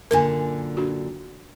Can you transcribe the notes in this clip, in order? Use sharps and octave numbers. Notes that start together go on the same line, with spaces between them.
F#2 A#2 D3 A#4 G#5
D4 F#4